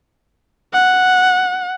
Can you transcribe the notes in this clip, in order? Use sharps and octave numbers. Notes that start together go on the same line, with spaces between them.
F#5